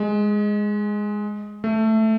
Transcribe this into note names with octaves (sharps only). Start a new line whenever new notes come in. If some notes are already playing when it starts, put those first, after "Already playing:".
Already playing: G#3
A3